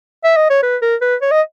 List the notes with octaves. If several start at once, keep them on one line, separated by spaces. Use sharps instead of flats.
E5
D#5
C#5
B4
A#4
B4
C#5
D#5